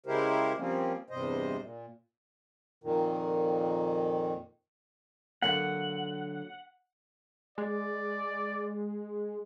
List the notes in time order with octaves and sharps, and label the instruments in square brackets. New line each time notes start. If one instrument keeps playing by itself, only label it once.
[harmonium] C#3 G#3 E4 G4 A#4 C5
F3 G3 A#3 C4 C#4
E2 G2 C3 G3 C5 D#5
A#2
F2 A#2 D#3
[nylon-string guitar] D3 F#3 A#3 [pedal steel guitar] F#5
[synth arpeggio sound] G#3 [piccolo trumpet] D5